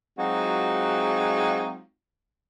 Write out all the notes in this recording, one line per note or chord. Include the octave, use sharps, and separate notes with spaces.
F#3 G#3 C4 D#4 F4 F#4